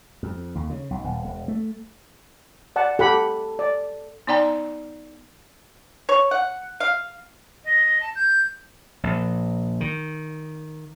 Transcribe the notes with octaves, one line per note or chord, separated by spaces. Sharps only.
F2
D#2
C#3
B1
D#1
E1
A3
D5 F#5 A5
G4 A4 F#5 B5
D5
B3 D#4 D5 G5 A#5
C#5
F#5
F5
D#5
A5
G6
A#1
D#3